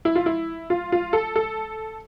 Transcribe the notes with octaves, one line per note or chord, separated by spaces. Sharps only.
E4
F4
E4
F4
F4
A4
A4